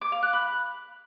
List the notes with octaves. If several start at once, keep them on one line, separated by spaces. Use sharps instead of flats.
D6
F5
F#6
B5